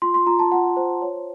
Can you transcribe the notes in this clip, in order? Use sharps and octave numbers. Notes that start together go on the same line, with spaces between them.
F4 C6
C6
F4 A#5
A5
F4 F#5
C5
C#5